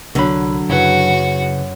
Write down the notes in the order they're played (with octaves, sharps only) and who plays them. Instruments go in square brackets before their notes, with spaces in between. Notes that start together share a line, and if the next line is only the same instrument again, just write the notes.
[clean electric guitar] C2 B5 [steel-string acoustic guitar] D3 F#3
[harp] F#2 [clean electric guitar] C#3 E4 B4 [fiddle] F#4